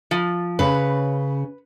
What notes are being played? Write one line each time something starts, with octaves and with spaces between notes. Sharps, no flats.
F3
C#3 C#4 B4